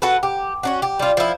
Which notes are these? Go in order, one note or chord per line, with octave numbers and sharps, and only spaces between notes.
F#4 A4 B4
G4
C#4 D4 F#4
G4
G3 F4
F3 E4